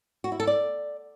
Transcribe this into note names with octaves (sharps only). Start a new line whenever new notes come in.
F#4
E4
A4
D5